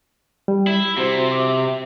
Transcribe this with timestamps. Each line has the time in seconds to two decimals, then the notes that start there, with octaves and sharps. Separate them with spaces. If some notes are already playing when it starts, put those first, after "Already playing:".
0.48 G3
0.67 E4
0.98 C3 F#4 C5
1.29 E5 D6